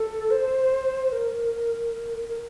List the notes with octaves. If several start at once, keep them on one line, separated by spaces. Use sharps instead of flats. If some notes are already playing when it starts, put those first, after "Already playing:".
Already playing: A4
C5
A#4
A#4